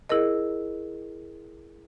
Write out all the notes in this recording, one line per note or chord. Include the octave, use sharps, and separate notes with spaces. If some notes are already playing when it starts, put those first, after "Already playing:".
E4 G#4 A#4 D#5